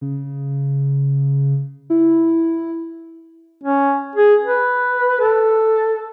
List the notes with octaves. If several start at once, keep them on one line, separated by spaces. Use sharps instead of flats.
C#3
E4
C#4
G#4
B4
A4